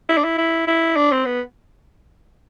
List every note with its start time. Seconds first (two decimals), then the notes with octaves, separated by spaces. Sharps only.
0.09 E4
0.17 D4
0.24 E4
0.38 E4
0.67 E4
0.96 D4
1.12 C4
1.25 B3